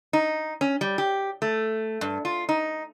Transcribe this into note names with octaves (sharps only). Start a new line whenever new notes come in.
D#4
C#4
G3
G4
A3
G2
F4
D#4